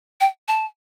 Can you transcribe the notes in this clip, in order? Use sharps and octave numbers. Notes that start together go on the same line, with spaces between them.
G5
A5